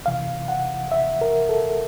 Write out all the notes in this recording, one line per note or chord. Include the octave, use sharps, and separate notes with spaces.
F2 C3 E3 F5
F#5
E5
A#4
A4